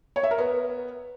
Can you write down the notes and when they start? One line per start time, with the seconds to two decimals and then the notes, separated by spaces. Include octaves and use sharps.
0.16 C#5
0.23 E5
0.31 A#4
0.38 B3